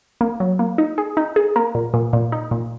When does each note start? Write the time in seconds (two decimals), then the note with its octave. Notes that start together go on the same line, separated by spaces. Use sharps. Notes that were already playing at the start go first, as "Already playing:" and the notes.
0.21 A#3
0.40 F#3
0.59 A#3
0.78 D#4
0.98 G#4
1.17 D#4
1.36 G#4
1.56 A#3
1.75 A#2
1.94 A#2
2.13 A#2
2.32 D#4
2.51 A#2